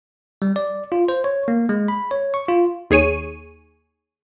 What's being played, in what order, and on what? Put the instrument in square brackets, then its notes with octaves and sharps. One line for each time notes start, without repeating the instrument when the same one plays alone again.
[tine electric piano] G3
D5
F4
C5
C#5
A#3
G#3
B5
C#5
C#6
F4
[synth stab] D#2 G#4 C#5 D#7